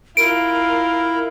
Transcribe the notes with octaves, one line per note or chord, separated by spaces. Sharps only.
E4 F4 A#4 D7